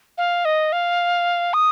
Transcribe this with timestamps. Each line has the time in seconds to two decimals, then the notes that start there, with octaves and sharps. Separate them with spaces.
0.18 F5
0.45 D#5
0.72 F5
1.54 D#6